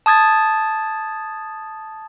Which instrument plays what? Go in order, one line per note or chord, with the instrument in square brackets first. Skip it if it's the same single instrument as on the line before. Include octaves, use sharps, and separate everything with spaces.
[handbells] A5 D#6 G#6 A6